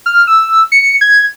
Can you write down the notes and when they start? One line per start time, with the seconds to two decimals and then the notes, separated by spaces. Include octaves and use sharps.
0.06 F6
0.27 E6
0.72 C#7
1.01 G#6